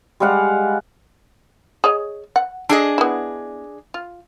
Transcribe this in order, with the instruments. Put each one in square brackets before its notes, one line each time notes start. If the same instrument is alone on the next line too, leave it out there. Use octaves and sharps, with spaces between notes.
[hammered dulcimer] G3 G#3 F5 F#5
[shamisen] G#4 C#5 D#5
F#5
[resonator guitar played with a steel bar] D4 G#4 D#5 [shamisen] A4
[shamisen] B3 E4
F4